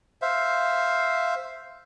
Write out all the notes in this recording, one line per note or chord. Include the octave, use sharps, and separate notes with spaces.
C5 E5 F5